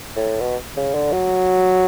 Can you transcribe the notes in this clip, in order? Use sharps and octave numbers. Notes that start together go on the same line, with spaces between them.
A2
B2
C#3
D3
F#3